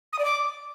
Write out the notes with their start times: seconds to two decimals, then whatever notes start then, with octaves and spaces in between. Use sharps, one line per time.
0.13 D#6
0.19 D5
0.25 D6